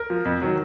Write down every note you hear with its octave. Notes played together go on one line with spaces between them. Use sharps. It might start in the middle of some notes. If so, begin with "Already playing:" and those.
Already playing: A#4
F3
F2
D#3 F#3